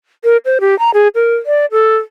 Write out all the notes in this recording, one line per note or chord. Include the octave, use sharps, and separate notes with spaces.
A#4
C5
G4
A#5
G#4
A#4
D5
A4